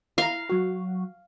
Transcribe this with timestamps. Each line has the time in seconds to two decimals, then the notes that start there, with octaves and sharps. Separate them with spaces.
0.18 E4 F5 A#5
0.49 F#3 F#4